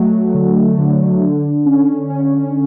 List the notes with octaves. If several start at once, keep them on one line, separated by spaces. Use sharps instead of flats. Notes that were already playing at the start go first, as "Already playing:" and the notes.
Already playing: F#3 A3
D3
D3
D3
C#4
C#4